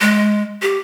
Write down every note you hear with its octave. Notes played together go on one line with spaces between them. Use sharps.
G#3
G4